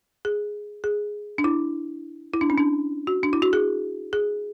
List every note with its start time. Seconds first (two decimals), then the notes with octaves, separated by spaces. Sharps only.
0.25 G#4
0.84 G#4
1.38 D4
1.44 E4
2.34 E4
2.41 D4
2.50 C#4
2.58 D4
3.07 F#4
3.23 D4
3.33 E4
3.42 F#4
3.53 G#4
4.13 G#4